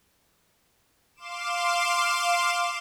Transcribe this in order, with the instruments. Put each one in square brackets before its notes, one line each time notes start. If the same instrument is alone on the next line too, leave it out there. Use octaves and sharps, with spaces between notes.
[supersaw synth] F5 C6 D6 E7